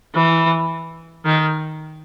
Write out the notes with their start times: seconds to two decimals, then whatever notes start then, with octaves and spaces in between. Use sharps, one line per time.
0.14 E3
1.26 D#3